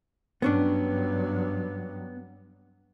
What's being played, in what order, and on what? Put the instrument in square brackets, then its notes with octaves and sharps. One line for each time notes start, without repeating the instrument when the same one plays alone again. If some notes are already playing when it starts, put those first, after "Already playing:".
[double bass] G2 F#3 [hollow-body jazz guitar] B3 C#4 D4